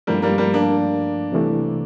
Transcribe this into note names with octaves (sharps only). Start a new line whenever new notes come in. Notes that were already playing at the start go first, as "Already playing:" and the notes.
G2 F3 G3 A3 A#3
G3 A#3
G3 A#3
A#3 D4
C2 C3 E3 A3